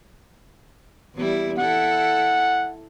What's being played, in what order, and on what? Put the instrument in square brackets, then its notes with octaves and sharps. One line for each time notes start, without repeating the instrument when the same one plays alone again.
[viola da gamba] E2 G3 E4
[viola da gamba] E4 A4 [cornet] F#5